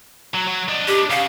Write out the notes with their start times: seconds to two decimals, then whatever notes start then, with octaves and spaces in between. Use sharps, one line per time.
0.34 F#3
0.47 F#3
0.69 D4 D#5
0.88 G4
1.10 C#3 F5